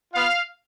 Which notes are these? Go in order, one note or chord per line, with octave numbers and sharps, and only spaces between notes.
B3 F4 F5